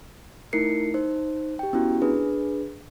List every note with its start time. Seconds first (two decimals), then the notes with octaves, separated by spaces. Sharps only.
0.53 A3 D#4 E4 A#4 C7 C#7
0.94 D#4 C5
1.59 G4 G5
1.73 B3 C#4 E4 F#4
2.02 D4 G#4 B4